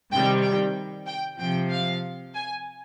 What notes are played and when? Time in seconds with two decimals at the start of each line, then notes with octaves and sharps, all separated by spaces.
0.11 C3 D#3 G3 G5
0.43 G5
1.07 G5
1.39 C3 F3 G5
1.71 F5
2.35 G#5